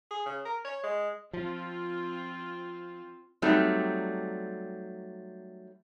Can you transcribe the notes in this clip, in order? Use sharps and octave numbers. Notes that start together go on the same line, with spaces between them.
G#4
C#3
A#4
C#5
G#3
F3 C4 F4
F#3 G3 A3 C4 D#4 G4